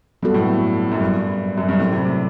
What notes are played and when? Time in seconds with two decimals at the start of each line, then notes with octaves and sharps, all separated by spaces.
0.23 G2 F#3 B3 F#4 A4
0.34 A2
0.45 G2
0.92 F#2
1.01 G2
1.58 F#2
1.69 G2
1.79 A2 F#3 C4 E4 G4
1.92 C3
2.05 C3